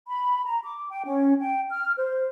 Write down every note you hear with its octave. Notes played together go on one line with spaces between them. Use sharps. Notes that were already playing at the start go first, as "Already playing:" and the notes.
B5
A#5
D6
G5
C#4
G5
F6
C5